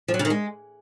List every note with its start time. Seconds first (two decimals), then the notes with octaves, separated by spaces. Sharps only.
0.08 F3
0.14 F#3
0.19 C#3
0.25 D#3
0.30 G#3